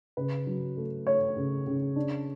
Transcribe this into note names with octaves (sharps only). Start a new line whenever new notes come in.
C#3 B4
F#3
A3
A3 C#5
C#3
C#3
D4